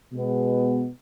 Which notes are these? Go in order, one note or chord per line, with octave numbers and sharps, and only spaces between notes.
B2 G#3 B3